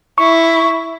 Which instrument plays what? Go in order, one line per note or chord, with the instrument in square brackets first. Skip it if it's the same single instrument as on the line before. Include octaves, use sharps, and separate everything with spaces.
[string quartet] E4 [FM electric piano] C#6